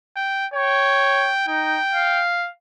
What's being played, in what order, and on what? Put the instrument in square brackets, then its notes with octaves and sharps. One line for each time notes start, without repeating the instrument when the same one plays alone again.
[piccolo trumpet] G5
[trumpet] C#5 [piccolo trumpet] G5
[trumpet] D#4 [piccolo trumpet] G5
[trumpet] F5